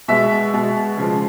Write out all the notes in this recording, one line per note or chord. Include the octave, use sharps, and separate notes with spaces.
B2 G#3 E5
B2 G#3
C#3 F3 G#3